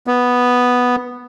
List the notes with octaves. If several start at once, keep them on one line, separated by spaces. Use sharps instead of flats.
B3